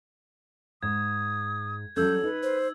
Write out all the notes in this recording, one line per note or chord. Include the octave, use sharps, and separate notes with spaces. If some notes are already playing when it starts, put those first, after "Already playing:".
G#2 D#6 G#6
F#3 G3 C#4 A4 E6 G6 G#6
D#4 B4
C5